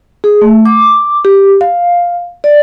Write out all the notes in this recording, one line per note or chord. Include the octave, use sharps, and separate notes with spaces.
G#4
A3
D6
G4
F5
D5